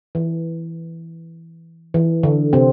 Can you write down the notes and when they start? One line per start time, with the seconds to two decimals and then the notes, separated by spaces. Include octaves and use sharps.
0.15 E3
1.94 E3
2.23 D3
2.53 C3 C4